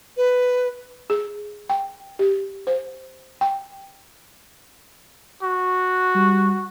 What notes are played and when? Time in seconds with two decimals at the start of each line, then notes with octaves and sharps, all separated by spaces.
0.17 B4
1.10 G#4
1.69 G5
2.19 G4
2.67 C5
3.41 G5
5.42 F#4
6.16 G3